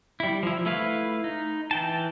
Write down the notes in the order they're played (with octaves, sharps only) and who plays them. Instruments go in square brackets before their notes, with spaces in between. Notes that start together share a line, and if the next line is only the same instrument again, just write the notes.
[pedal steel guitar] G3 E4
F3 E4
A3 E4 B4 F5
D#4
E3 G5 A5